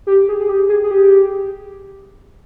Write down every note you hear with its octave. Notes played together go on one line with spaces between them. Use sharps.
G4
G#4
G#4
G4
G#4
G#4
G4